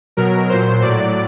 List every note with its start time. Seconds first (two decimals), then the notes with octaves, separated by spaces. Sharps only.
0.17 B2 F#3 A#4
0.49 A#2 F#3 C5
0.82 A2 F#3 D5